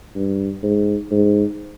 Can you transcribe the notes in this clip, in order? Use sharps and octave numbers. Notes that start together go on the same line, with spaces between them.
G2
G#2
G#2